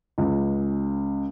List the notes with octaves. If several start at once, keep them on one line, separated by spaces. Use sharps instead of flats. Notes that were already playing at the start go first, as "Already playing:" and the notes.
C#2